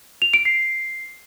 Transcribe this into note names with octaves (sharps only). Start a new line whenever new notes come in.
F7
D7
C7